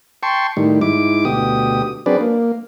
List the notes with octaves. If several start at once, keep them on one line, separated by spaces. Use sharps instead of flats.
G5 A5 C6 C#6
A2 D#3 G3
G#2 E4 D6
D2 B2 G4 D#6
F#3 C4 D4 G#4 B4 D5
A#3